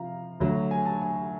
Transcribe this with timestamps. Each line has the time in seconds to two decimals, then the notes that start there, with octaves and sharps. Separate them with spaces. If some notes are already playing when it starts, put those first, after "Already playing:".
Already playing: C3 F3 F5 A#5
0.40 D2 D3 F#3
0.71 G#5
0.86 A5
1.02 G#5